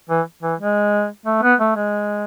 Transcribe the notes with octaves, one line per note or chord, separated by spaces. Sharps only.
E3
E3
G#3
A3
B3
A3
G#3